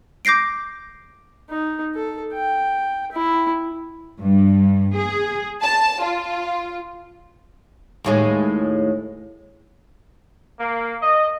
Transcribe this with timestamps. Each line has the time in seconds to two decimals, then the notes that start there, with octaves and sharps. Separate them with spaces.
0.25 D6 G6 A#6 C7 D7
1.49 D#4
1.95 A4
2.34 G5
3.12 E4
4.18 G2
4.95 G#4
5.63 A5
6.01 F4
8.04 D#2 A2 G#3
10.59 A#3
11.02 D#5